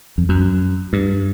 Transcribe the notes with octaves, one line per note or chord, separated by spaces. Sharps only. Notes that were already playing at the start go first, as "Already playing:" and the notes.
F2
F#2
G2